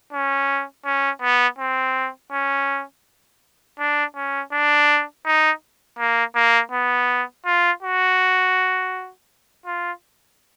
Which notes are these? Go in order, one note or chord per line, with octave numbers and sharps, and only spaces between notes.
C#4
C#4
B3
C4
C#4
D4
C#4
D4
D#4
A#3
A#3
B3
F4
F#4
F4